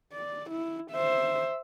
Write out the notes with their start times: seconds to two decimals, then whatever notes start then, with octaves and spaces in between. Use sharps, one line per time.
0.13 D5
0.51 E4
0.91 C5 E5